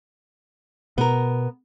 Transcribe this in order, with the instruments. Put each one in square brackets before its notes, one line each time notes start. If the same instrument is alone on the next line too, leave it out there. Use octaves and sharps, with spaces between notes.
[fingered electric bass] B2 [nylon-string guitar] B3 A#4